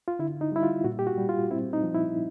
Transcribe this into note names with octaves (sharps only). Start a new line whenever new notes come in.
F4
D3 E4
D#4
G3 E4
F4
A#2 F#4
G4
F#4
G3
F4
C4 E4
D#4
F3
E4